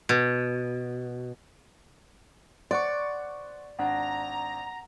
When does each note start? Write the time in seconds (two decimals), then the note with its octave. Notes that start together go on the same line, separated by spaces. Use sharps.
0.09 B2
2.71 C5 D5 F#5 C6 C#6
3.79 G#1 D4 F#5 A#5